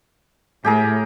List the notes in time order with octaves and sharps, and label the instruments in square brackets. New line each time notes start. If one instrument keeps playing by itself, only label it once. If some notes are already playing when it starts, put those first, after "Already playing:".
[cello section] A2 [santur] G4 G#4 A#4